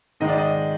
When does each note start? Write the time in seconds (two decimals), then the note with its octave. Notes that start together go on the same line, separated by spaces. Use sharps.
0.20 G#2 D#3 G#3 D#5
0.28 D5
0.38 D#5